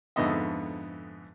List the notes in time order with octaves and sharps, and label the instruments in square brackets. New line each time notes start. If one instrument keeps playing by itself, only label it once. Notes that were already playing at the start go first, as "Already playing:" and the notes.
[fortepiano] F2 G#2 D3 B3 D#5 E5